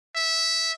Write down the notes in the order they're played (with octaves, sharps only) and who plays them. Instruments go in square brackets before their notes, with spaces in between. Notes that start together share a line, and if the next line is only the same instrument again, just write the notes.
[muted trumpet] E5